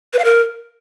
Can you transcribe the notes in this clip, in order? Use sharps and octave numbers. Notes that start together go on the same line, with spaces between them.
B4
F5
A#4